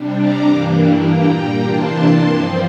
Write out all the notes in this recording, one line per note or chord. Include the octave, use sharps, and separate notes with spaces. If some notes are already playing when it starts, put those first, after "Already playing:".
Already playing: C3 G3 D4
A#5 D6
G2 E3 G3 A#3 D4
A#2 G3 A#3 G5 A#5
C3 E3 A#3 D4 A5 C6
G2 F3 C4 A5 C6